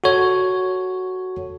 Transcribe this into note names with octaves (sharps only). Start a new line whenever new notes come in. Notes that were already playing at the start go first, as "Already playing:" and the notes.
F#4 A4 C#5